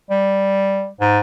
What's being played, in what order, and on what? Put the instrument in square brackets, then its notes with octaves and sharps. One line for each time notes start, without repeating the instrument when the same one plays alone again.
[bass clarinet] G3
G#2